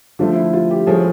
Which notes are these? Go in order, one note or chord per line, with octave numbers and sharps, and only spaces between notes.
D3 F3 A3 F4
E4
F4
G4
A2 F3 G#3 G#4